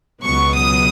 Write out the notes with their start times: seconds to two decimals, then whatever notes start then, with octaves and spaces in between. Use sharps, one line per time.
0.23 C#2 B2 F#3 B3 C#6
0.54 D#6